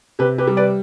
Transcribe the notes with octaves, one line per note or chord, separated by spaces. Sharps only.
C3 G4 B4
G4 B4
G3
B4 D5